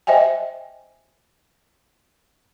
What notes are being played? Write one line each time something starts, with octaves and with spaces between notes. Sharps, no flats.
C5 D#5 E5 G5 G#5